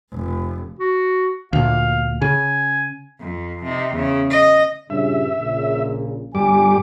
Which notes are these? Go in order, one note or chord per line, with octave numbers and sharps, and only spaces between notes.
F1
F#4
D2 A#2 F5
C#3 G#5
F2
C3 D#4
E2 C#3
D#5
G2 A#2 C#3 E5
A#1 A#2 C#3
G1 C#2 G2 G3 G#5 D6